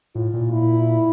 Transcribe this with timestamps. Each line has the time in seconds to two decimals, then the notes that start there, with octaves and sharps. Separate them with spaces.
0.15 A2 F4
0.34 A#2
0.53 E4